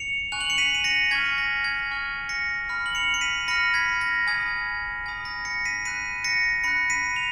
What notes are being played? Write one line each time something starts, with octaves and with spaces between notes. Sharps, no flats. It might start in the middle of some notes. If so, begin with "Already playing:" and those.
Already playing: C#7 F7
G#5 C#6 F#6 F7
F#7
C#7 F7
B6 D#7
D#7
A#6 C#7
G#5 C#6 F6 G#6 B6
A#6
G#6
G#5 C#6 F6
A#6 C#7
B5 F6
F#7
C#7 F7
C#7
B6 D#7
B5 F6 A#6 C#7
G#6 B6
A#6
G#5 B5 D#6 G#6
G#5 B5 D#6 G#6
A#6
A#6 C#7
B6 D#7
B5 F#6 B6 D#7
A#6 C#7
B5 F#6 A#6 C#7
B6 D#7
F7